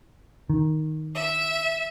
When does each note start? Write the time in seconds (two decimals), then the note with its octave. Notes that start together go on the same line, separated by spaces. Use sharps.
0.50 D#3
1.14 E5